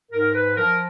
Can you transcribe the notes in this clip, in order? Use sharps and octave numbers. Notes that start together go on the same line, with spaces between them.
G#2 A#4
B4
F3 A#4